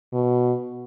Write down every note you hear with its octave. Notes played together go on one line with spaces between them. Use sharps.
B2